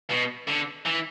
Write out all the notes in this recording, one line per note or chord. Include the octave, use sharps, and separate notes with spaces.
B2
D3
E3